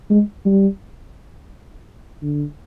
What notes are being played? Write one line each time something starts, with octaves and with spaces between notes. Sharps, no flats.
G#3
G3
D3